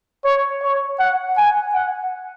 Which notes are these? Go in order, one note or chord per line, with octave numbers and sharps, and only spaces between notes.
C#5
C#5
F#5
G#5
F#5